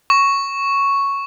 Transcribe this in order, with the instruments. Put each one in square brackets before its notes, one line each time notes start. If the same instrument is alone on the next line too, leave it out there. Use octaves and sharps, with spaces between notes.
[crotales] C#6